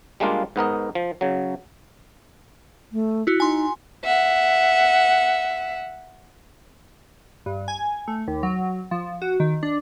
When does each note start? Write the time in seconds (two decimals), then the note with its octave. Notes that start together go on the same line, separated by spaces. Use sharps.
0.20 G3 G#3 A#3 D4 F4
0.56 G#2 B3 A#4 D#5
0.95 F3
1.21 C#3 F#3
2.92 A3
3.27 E4 F#4
3.40 D#4 G#5 C6
4.05 E5 F#5
7.46 G2
7.68 G#5
8.08 A3
8.28 D#2
8.43 F#3
8.91 F3
9.22 F#4
9.40 D#3
9.63 D4